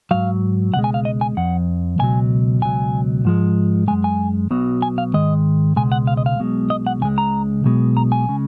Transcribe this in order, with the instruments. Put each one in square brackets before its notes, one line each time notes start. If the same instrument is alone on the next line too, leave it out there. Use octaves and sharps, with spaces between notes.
[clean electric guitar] G#2 F#3 F5
C#2 B2 G#3 F#5
G#5
F5
D#5
G#5
F2 F3 F#5
C#2 B2 F#3 G#5
C#2 B2 F#3 G#5
G#2 F3 G#3
F#2 D#3 G#3 G#5
G#5
B1 B2 F#3
G#5
F5
G#2 D#3 G#3 D#5
C#2 B2 G#3 G#5
F#5
F5
D#5
F5
B1 B2 G#3
D#5
F#5
C#2 C#3 G#3 G#5
A#5
B1 B2 G#3
A#5
G#5
C#3 G#3